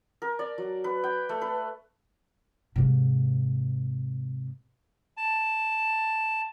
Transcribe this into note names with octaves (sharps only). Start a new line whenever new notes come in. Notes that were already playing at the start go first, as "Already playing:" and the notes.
A#4
D5
F#3
B4
G5
A3
B4
G#2 C3
A5